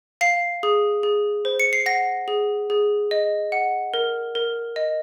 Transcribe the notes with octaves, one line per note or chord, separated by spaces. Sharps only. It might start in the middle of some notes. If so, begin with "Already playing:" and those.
F5 C7
G#4
G#4
C5
C#7
C7
F#5 A#6
G#4
G#4
D#5
F#5
A#4
A#4
D#5